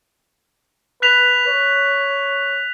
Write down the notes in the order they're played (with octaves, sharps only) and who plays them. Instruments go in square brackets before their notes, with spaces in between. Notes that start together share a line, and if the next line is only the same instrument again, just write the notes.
[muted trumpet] B4 [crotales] F#6 B6 F7
[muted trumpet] C#5